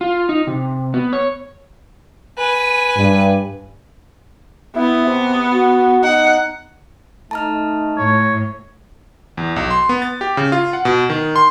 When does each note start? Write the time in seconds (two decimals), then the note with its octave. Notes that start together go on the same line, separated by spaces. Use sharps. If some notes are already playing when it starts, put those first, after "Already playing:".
0.01 F4
0.29 D#4
0.47 C3
0.94 B3
1.13 C#5
2.38 B4 G#5
2.97 G2
4.76 B3 E4
5.06 C3
5.52 F#4
6.04 D#4 F#5
7.31 A3 D#4 A5 A#5 F6
7.98 A2 C#5
9.37 E2
9.56 B1
9.70 C6
9.89 B3
10.02 A6
10.21 G4
10.37 C#3
10.52 F4
10.73 F#5
10.85 B2
11.10 D#3
11.36 C6